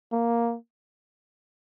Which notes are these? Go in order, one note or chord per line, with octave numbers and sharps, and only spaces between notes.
A#3